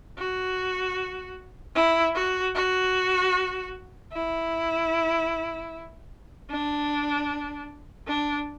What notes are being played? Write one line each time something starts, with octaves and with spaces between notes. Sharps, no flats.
F#4
E4
F#4
F#4
E4
D4
D4